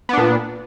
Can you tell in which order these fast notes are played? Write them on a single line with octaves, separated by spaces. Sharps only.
B3 D4 A#2